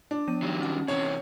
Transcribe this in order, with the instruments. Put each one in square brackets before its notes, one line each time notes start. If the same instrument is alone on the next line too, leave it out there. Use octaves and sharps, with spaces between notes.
[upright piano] D4
[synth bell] F3 B3 D#7
[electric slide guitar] D#3 F#3 G3
[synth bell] C#4 F#5
[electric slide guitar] C3 E3 [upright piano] C#5